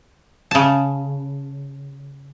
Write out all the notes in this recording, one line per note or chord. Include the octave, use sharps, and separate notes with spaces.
C#3 A5